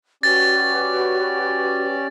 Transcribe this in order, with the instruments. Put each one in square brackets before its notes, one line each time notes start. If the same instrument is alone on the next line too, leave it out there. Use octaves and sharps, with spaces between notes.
[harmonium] C#4 G4 D5 [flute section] F#4 B4 [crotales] A6